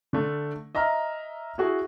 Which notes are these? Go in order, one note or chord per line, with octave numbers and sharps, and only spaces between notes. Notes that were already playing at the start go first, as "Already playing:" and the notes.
D3 A3
D#5 E5 A#5 F6
E4 F#4 G#4